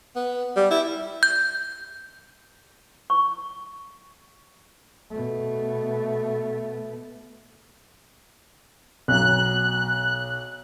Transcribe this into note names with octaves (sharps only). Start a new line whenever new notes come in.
B3
G3
E4
G6
C#6
B2 A3
B1 F#3 F#6